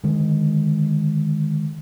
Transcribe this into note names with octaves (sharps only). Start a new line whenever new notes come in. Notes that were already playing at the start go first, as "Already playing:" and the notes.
D3 D#3 G#3